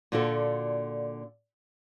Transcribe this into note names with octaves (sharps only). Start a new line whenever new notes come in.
A#2 D3 D4 F4 F#4 A4